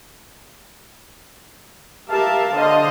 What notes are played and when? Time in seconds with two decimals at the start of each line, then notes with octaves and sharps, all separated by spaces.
2.08 G4 A#4 E5 F5 A5
2.53 D3 C5 D#5 F5